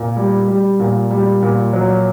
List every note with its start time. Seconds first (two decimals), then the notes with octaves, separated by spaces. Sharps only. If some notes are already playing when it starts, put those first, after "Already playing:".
Already playing: A#2
0.16 G3
0.48 G3
0.80 A#2
1.11 G3
1.42 A#2
1.73 F#3